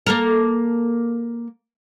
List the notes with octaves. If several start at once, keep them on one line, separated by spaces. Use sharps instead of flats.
A#3 A4 A#4